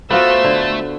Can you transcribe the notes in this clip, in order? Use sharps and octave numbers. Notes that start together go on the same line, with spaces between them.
A3 B3 F4 F#4 C5 E6
D3